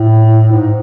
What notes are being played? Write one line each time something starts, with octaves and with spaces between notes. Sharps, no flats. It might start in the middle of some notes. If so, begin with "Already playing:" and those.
Already playing: A2
G#2